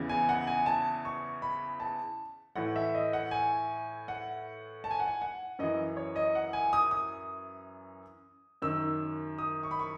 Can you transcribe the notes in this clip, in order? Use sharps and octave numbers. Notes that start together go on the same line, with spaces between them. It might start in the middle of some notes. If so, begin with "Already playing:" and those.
Already playing: E2 C#3 E3
G#5
F#5
G#5
A5
C#6
B5
A5
A2 E3 F#5
E5
D#5
F#5
G#5
F#5
A5
G#5
F#5
G#5
F#5
F#2 E3 D#5
C#5
D#5
F#5
G#5
D#6
D#6
F#2 D#3 E6
D#6
C#6
B5
C#6